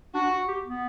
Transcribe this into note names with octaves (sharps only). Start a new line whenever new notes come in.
D4 F#4
F#4
G4
B3